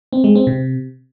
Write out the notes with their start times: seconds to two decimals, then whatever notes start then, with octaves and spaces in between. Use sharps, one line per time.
0.13 C4
0.24 G#3
0.35 C4
0.47 C3